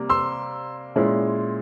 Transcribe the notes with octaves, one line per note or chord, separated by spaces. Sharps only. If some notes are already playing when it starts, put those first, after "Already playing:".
Already playing: C3 G3 A#3
C6 E6
A#2 G#3 C#4 E4